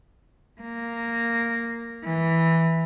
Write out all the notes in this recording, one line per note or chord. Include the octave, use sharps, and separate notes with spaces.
A#3
E3